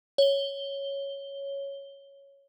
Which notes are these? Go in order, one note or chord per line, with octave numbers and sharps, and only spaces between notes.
C#5 G7